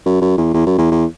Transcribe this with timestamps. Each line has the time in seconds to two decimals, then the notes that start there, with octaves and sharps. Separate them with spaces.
0.05 F#2
0.21 F#2
0.38 E2
0.54 E2
0.66 F#2
0.78 E2
0.92 E2